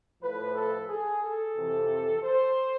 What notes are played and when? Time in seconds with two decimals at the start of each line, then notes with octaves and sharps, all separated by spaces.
0.21 A2 F3 B4
0.55 A4
0.88 G#4
1.22 A4
1.55 F2 C3 E3
2.22 C5